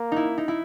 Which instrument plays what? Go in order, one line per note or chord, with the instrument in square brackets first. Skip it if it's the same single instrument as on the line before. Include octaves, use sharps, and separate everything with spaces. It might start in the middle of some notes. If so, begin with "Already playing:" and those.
Already playing: [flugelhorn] A#3
[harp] D#4 E4
D#4
E4